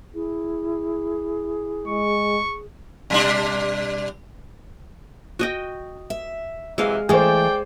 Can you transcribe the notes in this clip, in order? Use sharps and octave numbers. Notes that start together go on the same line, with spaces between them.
E4 G#4
G#3 C#6
B2 G3 D4
F#4 D#5 G5
E5
C3 E3 F#3 G#3 F5
E3 G#3 A3 G#4 C5 D5 G5